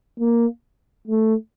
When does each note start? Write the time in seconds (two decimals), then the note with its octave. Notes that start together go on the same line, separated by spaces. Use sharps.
0.20 A#3
1.08 A3